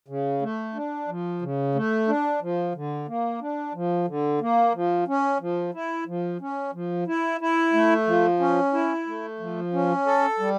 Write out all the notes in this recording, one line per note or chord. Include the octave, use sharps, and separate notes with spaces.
C#3
A3
D4
F3
C#3
A3
D4
F3
D3
A#3
D4
F3
D3
A#3
F3
C#4
F3
E4
F3
C#4
F3
E4
E4
A3
F3
C#4
E4
A3
F3
C#4
A4
G3